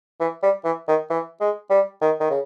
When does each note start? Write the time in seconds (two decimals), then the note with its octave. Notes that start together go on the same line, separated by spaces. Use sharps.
0.20 E3
0.43 G3
0.64 E3
0.88 D#3
1.09 E3
1.40 G#3
1.70 G3
2.01 D#3
2.20 D#3
2.30 C#3